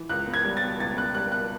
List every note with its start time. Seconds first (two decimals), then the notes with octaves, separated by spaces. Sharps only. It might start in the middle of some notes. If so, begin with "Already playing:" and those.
Already playing: E3
0.09 C#2 F#6
0.27 B3
0.34 G#6
0.44 G3
0.57 A6
0.62 B2
0.80 C#2 A6
0.97 B3 F#6
1.15 G3 F#6
1.32 B2 F#6